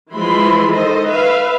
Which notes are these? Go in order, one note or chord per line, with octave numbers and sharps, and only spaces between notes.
E3 F3 G#3 E4 B5 C6
D#3 A4 C5 D#5
B4 E5 F5